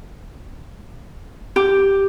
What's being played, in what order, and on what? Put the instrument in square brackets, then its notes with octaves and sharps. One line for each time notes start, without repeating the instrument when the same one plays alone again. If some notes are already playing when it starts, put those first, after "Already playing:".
[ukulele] G4